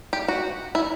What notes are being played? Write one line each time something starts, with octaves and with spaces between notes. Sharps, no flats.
G4
F#4
E4